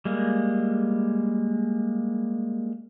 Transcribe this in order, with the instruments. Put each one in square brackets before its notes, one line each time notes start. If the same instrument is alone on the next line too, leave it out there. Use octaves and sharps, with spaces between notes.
[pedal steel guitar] G3 G#3 A#3